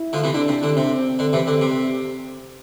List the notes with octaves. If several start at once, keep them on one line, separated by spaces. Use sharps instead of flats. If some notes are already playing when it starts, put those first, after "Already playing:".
Already playing: E4
D3 F3
C3 E3
D3 D4
C3
D3
C3 C4
D3
C3 E3
D3
C3